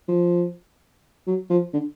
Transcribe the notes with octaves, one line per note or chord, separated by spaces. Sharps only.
F3
F#3
F3
D3